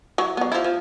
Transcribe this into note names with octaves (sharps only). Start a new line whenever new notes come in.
F#3 E4
F#3 B3
F3 E4
F3